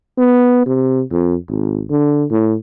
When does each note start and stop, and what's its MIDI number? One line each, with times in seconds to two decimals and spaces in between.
0.18 0.65 59
0.66 1.02 48
1.12 1.35 41
1.49 1.84 32
1.90 2.25 50
2.31 2.55 45